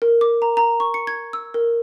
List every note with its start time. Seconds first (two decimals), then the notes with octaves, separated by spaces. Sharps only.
0.02 A#4
0.21 D6
0.42 A#5
0.57 A#5
0.80 C#6
0.94 C#7
1.07 G#6
1.33 E6
1.54 A#4